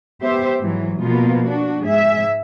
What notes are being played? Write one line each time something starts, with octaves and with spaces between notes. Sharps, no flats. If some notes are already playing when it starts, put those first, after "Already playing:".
B3 G4 C5 E5
G#2 E3 F#3 G#3
B2 F3 A#3 B3 F4
D4 F#4
G#2 G#4 E5